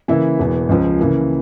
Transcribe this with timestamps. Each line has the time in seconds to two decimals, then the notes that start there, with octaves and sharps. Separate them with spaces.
0.08 C#3 E3 A#3 E4
0.39 E1 E2 E3
0.69 C#2 C#3 F3
0.98 C#3 E3 A#3